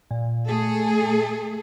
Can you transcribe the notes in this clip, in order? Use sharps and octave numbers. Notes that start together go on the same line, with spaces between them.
A#2
A3 G#4 A4